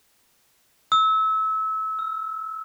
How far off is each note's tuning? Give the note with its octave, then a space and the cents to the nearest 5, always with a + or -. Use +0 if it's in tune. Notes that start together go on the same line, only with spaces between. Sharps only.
E6 -30
E6 +25